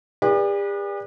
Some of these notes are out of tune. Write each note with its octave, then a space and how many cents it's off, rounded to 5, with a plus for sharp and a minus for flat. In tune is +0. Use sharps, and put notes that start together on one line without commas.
G4 +45 B4 -30 D5 +0